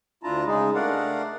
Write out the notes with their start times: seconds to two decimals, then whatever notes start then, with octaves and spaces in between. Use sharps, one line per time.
0.23 D2 D4 E4 F4 A5 A#5
0.47 C#3 G#3 D#4 G#4
0.75 A3 D4 A#4 D5 F5 F#5